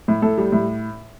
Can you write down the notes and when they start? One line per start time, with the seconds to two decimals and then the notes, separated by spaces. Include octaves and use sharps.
0.08 A2
0.22 A2 A4
0.38 G3
0.52 A2